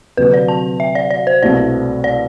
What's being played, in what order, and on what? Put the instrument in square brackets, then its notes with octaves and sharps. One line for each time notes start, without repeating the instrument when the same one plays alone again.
[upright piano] D2 C3 F#3 [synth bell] B4
[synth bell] D5
A5
E5
D5
D5
C5
[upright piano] C2 B2 A3 E4 [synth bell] D5
[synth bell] D5